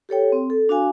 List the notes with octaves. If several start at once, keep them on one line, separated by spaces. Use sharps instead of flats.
G4 A4 C#5 G5
C4
A4
D4 F#4 F5 G#5